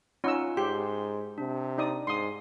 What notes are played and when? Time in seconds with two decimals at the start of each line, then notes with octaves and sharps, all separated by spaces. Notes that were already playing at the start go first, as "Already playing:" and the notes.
0.24 C#4 D#4 F4 F#5 E6
0.57 G#2 G4 C6
1.38 C3 D4
1.78 D#4 D5 D#6
2.07 G#2 C6 D#6